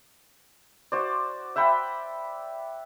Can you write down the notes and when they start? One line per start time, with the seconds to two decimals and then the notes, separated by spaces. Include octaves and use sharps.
0.92 F#4 C5 D5
1.56 E5 F#5 G5 B5